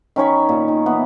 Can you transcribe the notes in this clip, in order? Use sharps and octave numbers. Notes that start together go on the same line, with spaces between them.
D#3 C#4 C#5 B5
A#2
D#3
E3 B3